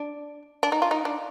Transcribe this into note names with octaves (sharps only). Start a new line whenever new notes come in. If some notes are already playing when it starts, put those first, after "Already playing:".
Already playing: D4
D4
D#4
F4
D#4
D4